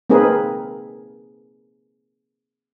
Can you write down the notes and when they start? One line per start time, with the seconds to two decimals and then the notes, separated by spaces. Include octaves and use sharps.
0.10 A#3 C4 D#4 G#4 A#4 B4